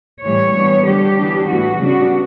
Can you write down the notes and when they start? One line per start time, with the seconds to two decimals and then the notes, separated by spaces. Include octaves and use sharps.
0.23 A2 E3 G3 C#5
0.55 E3 G3 B3 D4
0.85 D3 G3 D4 G4
1.16 E3 B3 D4
1.48 A2 E3 B3 F#4
1.80 C#3 G3 B3 D4